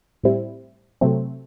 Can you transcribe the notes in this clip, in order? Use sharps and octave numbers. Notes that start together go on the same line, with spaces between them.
A2 G3 C4 E4
C3 F#3 A3 C4